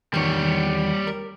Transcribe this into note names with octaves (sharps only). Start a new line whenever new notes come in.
E2 D#3 G3 C#5
A#4